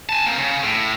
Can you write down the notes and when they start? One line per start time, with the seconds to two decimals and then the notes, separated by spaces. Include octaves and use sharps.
0.09 G#5 A5
0.26 A#3 C4
0.38 C#3
0.63 A2